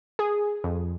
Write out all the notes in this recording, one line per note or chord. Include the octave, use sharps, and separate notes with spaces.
G#4
F2